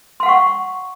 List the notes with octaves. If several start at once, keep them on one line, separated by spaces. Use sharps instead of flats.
F5 F#5 C6 C#6